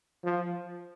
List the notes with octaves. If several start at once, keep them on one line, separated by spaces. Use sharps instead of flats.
F3